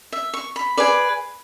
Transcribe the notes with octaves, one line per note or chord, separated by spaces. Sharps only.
E5
C#6
B5
G#4 B4 D5